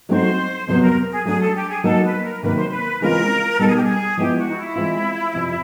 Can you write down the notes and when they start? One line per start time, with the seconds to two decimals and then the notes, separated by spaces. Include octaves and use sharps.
0.09 F#3 A3 C4 D#4 F#4 C5
0.67 F2 C3 D#3 F#3 B3 C5
0.81 A#4
1.11 G#4
1.25 F#3 A3 D4 G#4
1.40 A4
1.55 G4
1.69 G#4
1.84 F#3 A#3 D#4 F#4 A4 A#4
2.04 B4
2.23 A#4
2.42 C3 D#3 F#3 A#3 B4
2.55 C5
2.69 B4
3.00 C#3 E3 G#3 C4 F4 A#4
3.59 B2 G3 B3 D#4 A4
3.67 G#4
3.76 G4
3.83 G#4
4.17 F3 G#3 B3 E4 G4
4.36 F#4
4.49 D#4
4.55 E4
4.75 E3 G#3 C4 F4
5.34 F2 C3 F3